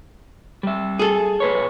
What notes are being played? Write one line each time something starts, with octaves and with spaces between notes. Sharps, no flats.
G3 E5
G#4 A4
A#2 B4 C#5